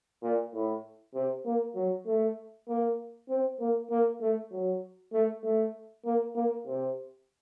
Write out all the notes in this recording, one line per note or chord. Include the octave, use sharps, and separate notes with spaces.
A#2
A2
C3
A#3
F#3
A3
A#3
C4
A#3
A#3
A3
F#3
A3
A3
A#3
A#3
C3